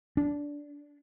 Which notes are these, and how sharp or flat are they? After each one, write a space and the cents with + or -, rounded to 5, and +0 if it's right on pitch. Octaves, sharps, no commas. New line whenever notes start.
D4 -15